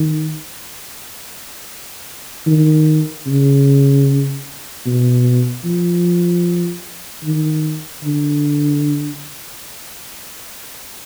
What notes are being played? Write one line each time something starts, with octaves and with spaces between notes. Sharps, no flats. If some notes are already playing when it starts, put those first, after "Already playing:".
Already playing: D#3
D#3
C#3
B2
F3
D#3
D3